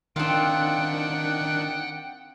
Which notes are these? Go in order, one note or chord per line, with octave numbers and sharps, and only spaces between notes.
D#3 C4 D4 F4 F#5 G5 F#6